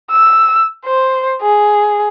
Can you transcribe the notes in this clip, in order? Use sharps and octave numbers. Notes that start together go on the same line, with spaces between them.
E6
C5
G#4